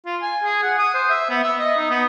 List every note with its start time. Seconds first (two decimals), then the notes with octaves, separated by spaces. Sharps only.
0.06 F4
0.22 G#5
0.43 G#4
0.63 F#5
0.78 D#6
0.94 C5
1.10 E5
1.30 B3
1.44 E5
1.59 D#5
1.77 D#4
1.90 B3